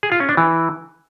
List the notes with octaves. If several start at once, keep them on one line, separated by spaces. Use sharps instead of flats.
G#4
F4
C#4
D4
E3